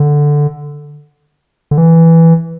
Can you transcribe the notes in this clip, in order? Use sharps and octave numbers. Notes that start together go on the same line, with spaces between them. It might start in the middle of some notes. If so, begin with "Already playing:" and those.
Already playing: D3
D3
E3